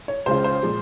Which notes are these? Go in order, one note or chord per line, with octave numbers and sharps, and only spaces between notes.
C#5
C#2 C#3 G#3 C#4 F4 C5
C5
A#2 F3 G#3